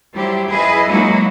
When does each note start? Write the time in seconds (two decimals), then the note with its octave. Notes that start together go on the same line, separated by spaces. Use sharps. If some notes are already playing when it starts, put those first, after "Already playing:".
0.14 F#3 G3 E4 G4 C5
0.48 E4 G#4 B4 D#5
0.88 F#3 G#3 A#3 D#4 E4 F#4